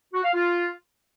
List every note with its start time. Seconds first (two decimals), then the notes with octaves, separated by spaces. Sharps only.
0.14 F#4
0.24 F5
0.34 F4